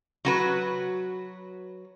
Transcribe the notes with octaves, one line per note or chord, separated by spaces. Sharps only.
F#3 F#4 B4